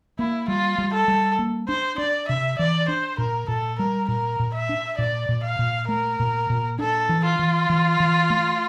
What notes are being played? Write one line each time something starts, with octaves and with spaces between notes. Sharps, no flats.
A#3 E4
G3 F4
G3
A4
G3
A#3
D4 C5
D4 D5
C3 E5
E3 D5
D4 C5
A#2 A#4
A#2 A4
G3 A#4
A#2 A#4
A#2
E5
D4
A#2 D5
A#2
F5
A#2
A3 A#4
A#2
A#2
D4 A4
E3
F4
E3
E3
E3
A3